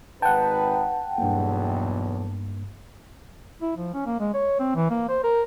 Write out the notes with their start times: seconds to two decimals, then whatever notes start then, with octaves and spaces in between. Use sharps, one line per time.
0.22 G#1 D#4 B4 F#5 G5 A5
1.18 B1 E2 G2 A#3
3.62 E4
3.77 F3
3.94 C#4
4.06 A#3
4.20 G#3
4.34 C#5
4.59 C4
4.75 E3
4.90 A#3
5.09 C5
5.24 A#4